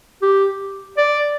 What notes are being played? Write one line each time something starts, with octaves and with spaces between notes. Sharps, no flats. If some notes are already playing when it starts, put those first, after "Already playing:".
G4
D5